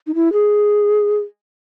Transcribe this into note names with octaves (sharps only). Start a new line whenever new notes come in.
D#4
E4
G#4